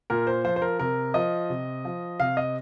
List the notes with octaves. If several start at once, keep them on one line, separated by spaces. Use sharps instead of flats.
A#2 A#4
C5
F3 C5
C5
A#4
C3 A#4
F3 D#5
C3
F3
C3 F5
D#5